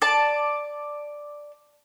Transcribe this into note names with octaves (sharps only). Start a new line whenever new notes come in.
D5 A5